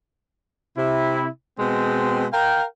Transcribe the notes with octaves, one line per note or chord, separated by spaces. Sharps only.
C3 E4
B2 G#3 C4
A#4 F5 G5